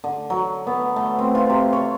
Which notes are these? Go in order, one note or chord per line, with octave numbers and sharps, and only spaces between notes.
D3
F#3
B3
A3
C4
F4
C3
C#5